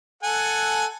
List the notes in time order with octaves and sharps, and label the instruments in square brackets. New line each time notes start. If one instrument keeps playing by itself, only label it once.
[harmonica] A4 F#5 G#5